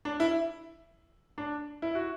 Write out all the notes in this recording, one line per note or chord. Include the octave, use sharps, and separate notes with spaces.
D4
E4
D4
E4
F#4